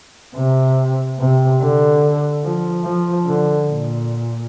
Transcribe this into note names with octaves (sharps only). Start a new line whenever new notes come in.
C3
C3
D3
F3
F3
D3
A#2